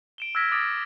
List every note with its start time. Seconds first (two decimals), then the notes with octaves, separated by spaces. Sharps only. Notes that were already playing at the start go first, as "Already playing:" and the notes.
0.18 D7 E7 G7
0.35 E6 F6 G#6 A#6 B6 D7
0.52 D6 D#6 A6 A#6 D7